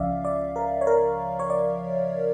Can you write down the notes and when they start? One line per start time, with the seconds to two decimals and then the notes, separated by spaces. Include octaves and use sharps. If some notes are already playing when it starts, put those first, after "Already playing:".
Already playing: C#2 C#3 F3 C#4 D5 E5 F5
0.25 D5
0.56 A#4
0.81 C#5
0.87 A#4
1.39 C#5
1.50 D5